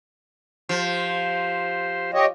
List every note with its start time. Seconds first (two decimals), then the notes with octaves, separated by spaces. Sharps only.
0.69 F3 G4 C5
2.14 G4 C#5 D#5